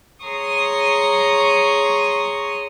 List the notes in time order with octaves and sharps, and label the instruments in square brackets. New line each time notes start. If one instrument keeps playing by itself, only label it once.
[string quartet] G#4 C#5 A#5 C6 C#6 D#6